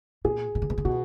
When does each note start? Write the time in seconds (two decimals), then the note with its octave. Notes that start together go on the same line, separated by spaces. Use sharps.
0.25 A#2 G#4
0.55 B2
0.62 C3
0.70 B2
0.78 C3
0.85 B2 F#4